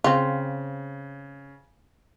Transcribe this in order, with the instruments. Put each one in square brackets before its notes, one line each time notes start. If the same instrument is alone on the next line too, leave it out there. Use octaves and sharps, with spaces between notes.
[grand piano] C#3 [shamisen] C4 F4